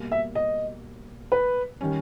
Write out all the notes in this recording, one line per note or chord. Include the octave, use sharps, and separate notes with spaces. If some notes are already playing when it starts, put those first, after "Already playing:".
Already playing: B2 G3 A#3
E5
D#5
B4
D#3 G3 C#4